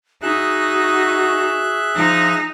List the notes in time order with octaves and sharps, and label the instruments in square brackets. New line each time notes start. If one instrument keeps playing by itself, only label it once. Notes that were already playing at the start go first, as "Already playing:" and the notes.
[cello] D#4 [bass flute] F#4 [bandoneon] G#4 [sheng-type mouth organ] E5 F#6
[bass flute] F3 [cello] D#4